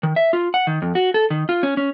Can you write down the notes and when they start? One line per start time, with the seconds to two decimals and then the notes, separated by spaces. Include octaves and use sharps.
0.03 D#3
0.16 E5
0.33 F4
0.54 F#5
0.67 D#3
0.82 F2
0.95 F#4
1.14 A4
1.30 D#3
1.49 F4
1.63 C#4
1.77 C#4